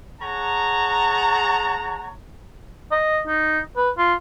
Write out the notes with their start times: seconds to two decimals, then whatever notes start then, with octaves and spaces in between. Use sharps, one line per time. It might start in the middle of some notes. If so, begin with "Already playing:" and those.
0.20 G#4 C#5 F#5 A5 A#5
2.91 D#5
3.28 D#4
3.77 B4
3.98 F4